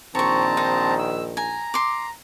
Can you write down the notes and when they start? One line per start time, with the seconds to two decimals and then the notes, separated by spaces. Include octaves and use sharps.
0.15 A#1 D#3 C4 C#5 A5 A#5 C#6
0.57 D#4 C5
0.98 E6
1.37 G#5 A#5
1.74 C6 D6